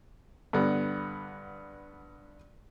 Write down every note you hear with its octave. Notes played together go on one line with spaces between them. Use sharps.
G2 D3 B3